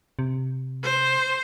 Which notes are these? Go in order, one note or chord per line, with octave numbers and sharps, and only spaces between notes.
C3
C5